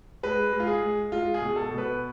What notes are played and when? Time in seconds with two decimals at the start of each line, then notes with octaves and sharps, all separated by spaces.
0.23 G#3 B4
0.53 G#3
0.60 F4
0.67 G#4
0.82 G#3
1.12 G#3 F4
1.34 G#4
1.42 B2
1.56 A4
1.71 B2
1.78 B4